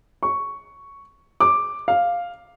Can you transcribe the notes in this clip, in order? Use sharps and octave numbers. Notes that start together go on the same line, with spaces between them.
C#6
D6
F5